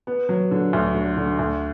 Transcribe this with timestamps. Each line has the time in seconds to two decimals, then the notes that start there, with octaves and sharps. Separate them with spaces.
0.07 B3
0.29 F#3
0.51 D3
0.73 D2
0.95 D3
1.17 D3
1.39 D2